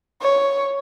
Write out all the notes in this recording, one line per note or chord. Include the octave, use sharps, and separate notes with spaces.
C#5